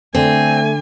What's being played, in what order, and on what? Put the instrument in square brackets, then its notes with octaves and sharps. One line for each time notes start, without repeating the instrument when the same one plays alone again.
[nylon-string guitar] D3 D4 [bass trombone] A3 [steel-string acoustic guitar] C4 [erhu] G#5